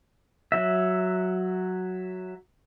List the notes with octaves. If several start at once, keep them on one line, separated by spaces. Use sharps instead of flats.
F#3 E5